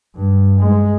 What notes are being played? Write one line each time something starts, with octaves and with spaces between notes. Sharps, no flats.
G2
G#3